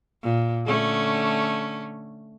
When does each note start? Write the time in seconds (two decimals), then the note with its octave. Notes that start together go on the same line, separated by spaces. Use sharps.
0.22 A#2
0.65 D3 A3 C#4